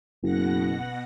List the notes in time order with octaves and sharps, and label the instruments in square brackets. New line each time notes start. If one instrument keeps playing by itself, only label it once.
[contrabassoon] F#1 [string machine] B2 F#5 A#6